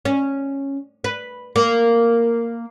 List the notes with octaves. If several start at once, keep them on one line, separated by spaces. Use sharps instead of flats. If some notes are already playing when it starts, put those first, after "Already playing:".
C#4
B4
A#3